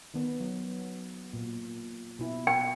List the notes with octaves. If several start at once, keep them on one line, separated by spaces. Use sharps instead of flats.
D#3 B3
F#3
A#2
B2 E4
G5